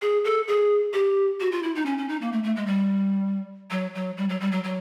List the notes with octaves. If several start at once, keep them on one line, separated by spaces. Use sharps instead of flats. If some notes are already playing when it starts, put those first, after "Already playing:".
G#4
A4
G#4
G4
F#4
F4
E4
D#4
C#4
C#4
D#4
A#3
A3
A3
G#3
G3
F#3
F#3
G3
F#3
G3
F#3
F#3